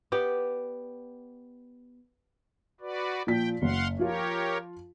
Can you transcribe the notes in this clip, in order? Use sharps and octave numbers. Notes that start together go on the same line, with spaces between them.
B3 G4 D5
F#4 B4 D5
A#2 F3 G5 B6
F#1 F5 F#5 C6
F3 F4 G4 A#4 C#5